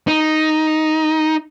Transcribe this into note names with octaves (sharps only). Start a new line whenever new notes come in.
D#4